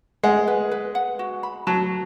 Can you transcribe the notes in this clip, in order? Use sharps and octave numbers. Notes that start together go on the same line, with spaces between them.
G#3 F#5
B4
B4
F#5
F#4
B5
F#3 A5